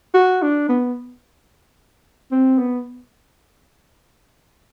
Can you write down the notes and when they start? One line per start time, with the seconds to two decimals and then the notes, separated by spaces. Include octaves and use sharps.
0.14 F#4
0.42 D4
0.69 B3
2.31 C4
2.59 B3